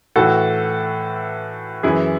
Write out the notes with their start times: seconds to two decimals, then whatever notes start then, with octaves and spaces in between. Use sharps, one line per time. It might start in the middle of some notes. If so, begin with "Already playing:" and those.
0.16 A2 E3 F#4 A4
1.83 F#2 E3 E4 G#4